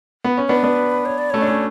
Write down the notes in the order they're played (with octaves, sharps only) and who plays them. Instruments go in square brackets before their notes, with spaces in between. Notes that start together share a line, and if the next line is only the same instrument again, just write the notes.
[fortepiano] B3
C#4
[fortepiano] B3 D4 [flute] B4
[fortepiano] B3 D4
[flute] C#5
D5
[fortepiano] A3 C#4 [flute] C#5
[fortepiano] D4
A3 C#4